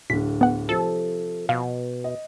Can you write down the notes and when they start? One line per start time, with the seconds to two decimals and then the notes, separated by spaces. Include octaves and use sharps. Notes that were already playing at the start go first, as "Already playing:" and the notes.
0.10 D1 D3 B6
0.41 B3 F#5
0.69 C3 F3 A4
1.49 B2 F5
2.04 D#5